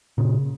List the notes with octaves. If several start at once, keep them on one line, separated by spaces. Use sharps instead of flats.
A#2 C#3